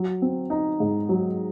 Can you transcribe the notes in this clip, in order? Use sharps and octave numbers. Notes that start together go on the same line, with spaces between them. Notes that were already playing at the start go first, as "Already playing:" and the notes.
Already playing: F#3
C4
D#4
G#2
F#3